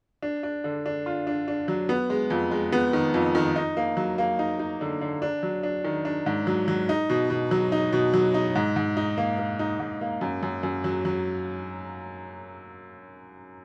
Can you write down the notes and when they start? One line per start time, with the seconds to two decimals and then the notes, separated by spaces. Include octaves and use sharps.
0.23 D4
0.43 D4
0.64 D3
0.86 D4
1.06 F4
1.27 D4
1.48 D4
1.68 F#3
1.89 B3
2.10 G#3
2.30 F2
2.51 G#3
2.72 B3
2.93 D#3
3.14 F2
3.35 D#3
3.56 D#4
3.77 A#3
3.97 F#3
4.18 A#3
4.39 D#4
4.59 D#4
4.81 D3
5.01 D3
5.22 D4
5.43 F#3
5.63 D4
5.84 D#3
6.05 D4
6.26 G#2
6.47 F#3
6.68 F#3
6.89 D#4
7.10 B2
7.30 B2
7.51 F#3
7.72 D#4
7.93 B2
8.14 F#3
8.34 D#4
8.55 G#2
8.76 G#2
8.97 D#4
9.18 A#3
9.38 A#3
9.59 D#4
9.80 G#2
10.01 A#3
10.21 F#2
10.43 F#2
10.63 F#2
10.84 F#3
11.05 F#3